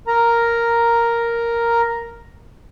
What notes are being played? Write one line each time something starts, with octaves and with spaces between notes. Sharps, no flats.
A#4 A#5